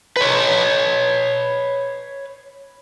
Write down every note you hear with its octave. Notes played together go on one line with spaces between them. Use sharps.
B4 C#5